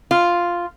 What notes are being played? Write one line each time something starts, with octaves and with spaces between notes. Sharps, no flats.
F4